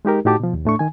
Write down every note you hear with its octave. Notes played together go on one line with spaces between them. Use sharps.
G#3 D#4 G4 A#4
A2 D#4 F#4 G4 A5 D6
B2 F3
D#2
A2 A3 D4 C#6
D#3 G#5